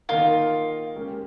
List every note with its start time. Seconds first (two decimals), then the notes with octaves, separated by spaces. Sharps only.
0.09 D#3 A#3 D#4 F4 A#4
0.96 G#3 C#4 G4 A#4